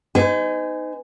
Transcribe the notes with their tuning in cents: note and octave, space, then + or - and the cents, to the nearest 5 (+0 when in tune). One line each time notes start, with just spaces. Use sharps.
D#4 +0 C5 -45 G#5 +0